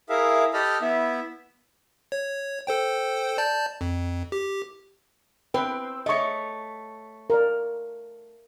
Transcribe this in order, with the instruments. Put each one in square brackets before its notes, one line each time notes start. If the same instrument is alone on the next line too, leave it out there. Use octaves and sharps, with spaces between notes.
[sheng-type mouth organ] E4 G#4 A#4 E5 F5
G4 A4 D#5 B5 F6
B3 E4 E5
[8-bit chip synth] C#5
A4 C5 G5
D5 A5 G6
F2
G4
[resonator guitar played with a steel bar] C4 [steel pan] B4 G5
[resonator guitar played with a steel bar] A3 C#5 [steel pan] D#5 C#6
[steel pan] A#4 D5